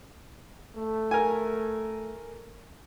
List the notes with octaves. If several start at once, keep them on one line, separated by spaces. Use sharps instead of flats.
A3
A#4 G#5